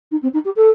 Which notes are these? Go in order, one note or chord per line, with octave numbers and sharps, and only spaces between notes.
D#4
C4
D#4
G4
A4